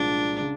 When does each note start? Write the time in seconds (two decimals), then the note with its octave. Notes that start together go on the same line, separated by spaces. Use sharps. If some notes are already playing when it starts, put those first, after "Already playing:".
Already playing: C2 A#2 F3 G#3 D4
0.40 C#3